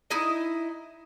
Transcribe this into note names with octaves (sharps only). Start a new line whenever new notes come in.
D#4 E4 D#5